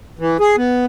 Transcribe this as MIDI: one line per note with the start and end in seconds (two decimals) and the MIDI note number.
0.19 0.37 52
0.40 0.56 68
0.57 0.86 59